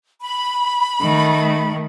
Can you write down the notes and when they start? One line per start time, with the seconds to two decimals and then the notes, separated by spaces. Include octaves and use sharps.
0.22 B5
1.01 D#3 A3